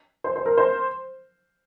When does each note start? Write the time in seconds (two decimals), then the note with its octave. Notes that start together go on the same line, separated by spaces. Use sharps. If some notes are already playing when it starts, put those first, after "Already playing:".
0.24 C5
0.36 C5
0.46 A#4
0.58 C5